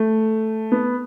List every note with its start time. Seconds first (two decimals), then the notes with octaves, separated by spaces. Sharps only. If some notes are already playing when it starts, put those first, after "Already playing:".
Already playing: A3
0.72 B3